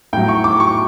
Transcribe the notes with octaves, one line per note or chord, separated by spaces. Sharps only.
A2 F#3 G5
C#6
D6
C#6